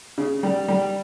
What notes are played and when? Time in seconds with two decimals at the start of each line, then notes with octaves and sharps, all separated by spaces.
0.18 C#3
0.43 G3
0.68 G3